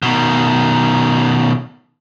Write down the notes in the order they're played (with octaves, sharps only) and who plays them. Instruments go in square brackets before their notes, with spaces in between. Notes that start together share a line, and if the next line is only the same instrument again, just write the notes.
[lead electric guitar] B2 D#3